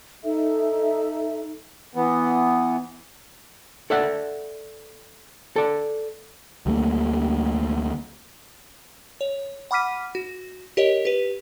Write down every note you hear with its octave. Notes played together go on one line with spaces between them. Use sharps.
D#4 A4 E5
E3 B3
A4 D5 E5 F#5
A4 D5
D2 G3 A3 A#3
C#5
F#5 B5 D6 F6 B6 D#7
F#4
G4 A#4 C#5 D#5
G4 B4